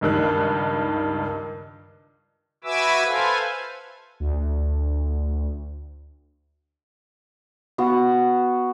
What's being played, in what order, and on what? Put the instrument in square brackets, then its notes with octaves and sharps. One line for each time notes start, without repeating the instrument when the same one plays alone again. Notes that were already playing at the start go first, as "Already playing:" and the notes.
[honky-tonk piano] C#2 G2 D#3 F#6
[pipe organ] F#4 B4 E5 G#5 D6 E6
A4 B4 C5 F5 G#5
[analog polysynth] D2
[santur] B3 F#4